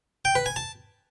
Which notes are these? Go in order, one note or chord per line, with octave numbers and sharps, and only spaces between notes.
G5
B4
G#5
A5